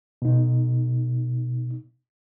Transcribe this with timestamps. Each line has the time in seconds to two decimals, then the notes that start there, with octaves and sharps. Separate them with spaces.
0.22 B2 D#4